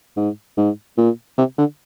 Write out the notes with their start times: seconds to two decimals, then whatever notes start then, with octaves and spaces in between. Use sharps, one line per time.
0.17 G#2
0.57 G#2
0.97 A#2
1.38 C3
1.58 D3